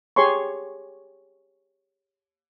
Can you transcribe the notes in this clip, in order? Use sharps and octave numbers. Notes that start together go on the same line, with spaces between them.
G4 G#4 C#5 G#5 C6 C#6